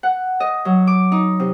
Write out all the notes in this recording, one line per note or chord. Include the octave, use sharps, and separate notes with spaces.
F#5
D#5
F#3
D6
D#4
C3